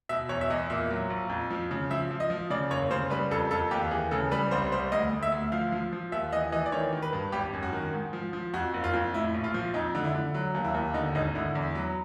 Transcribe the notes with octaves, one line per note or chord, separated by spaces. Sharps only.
B2 E5
E2 C#5
E5
E2 D#5
A#2 E5
F#3
A#1
F2
F3
C#3
F3 E5
F3
D#5
F3
C#3 D5
F#1 C#5
C#3 C5
G3 B4
F2 A4
F2 A4
D#2 G4
E3 G#4
C#3 A4
G3 B4
C2 C5
G3 C5
D2 D#5
D2
E5
D2
F3 F5
F3
F3
D#2 E5
E3 D#5
E3 D#5
D5
D#3 C#5
D#3
B4
G2
G#1 G4
F#2
F#4
D#3
G#2
F3
F3
F2 F#4
F#1
F4
F2
A2 E4
A#1
F4
F3
F2 D#4
D3
E4
D3
F#3
D#2
E4
D#2
D3 D#4
G#1 D#4
D3 E4
E2
F#3